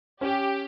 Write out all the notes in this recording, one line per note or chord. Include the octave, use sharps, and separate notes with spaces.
C#4 G4